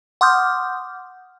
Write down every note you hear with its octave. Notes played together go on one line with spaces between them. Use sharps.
F#5 C6 D6 D#6 F6 G6